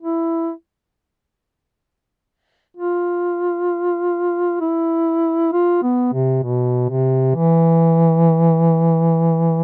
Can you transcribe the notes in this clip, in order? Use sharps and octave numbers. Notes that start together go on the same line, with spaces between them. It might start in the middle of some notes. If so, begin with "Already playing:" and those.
E4
F4
E4
F4
B3
C3
B2
C3
E3